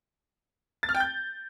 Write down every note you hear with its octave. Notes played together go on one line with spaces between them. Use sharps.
A6
F6
G5
G6